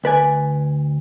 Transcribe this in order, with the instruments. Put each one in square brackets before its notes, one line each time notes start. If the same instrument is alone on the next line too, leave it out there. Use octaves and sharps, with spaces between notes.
[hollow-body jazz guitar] D2 B4 D5 G#5